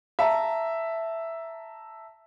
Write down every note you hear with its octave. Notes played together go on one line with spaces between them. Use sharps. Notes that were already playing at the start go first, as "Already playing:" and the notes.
E5 A5 A#5